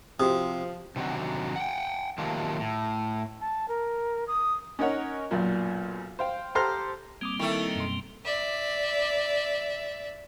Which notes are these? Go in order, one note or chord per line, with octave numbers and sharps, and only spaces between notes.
C3 F3 F#4 G4 D#6
C3 D#3 F#3 D4 F#4
F#5 G5
D#3 F3 F#3 A3 A#3 G4
A2
A5
A#4
D#6
C#4 D#4 A#4 C#5 F#5
B1 F#2 A#2
C5 F5 G5
G4 A4 C5 A#5 C6 F6
G3 A#3 C4 D6 D#6 G#6
D#3 A3 E4 C#6
F#2 B2 C6
D5 E5